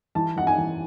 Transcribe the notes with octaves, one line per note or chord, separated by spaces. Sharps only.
E3 A5
E3 F#5
G#5
E3